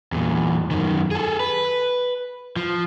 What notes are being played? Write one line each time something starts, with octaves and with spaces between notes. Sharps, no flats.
E2 A#2
F#2 D#3
G#4 A4
B4
F3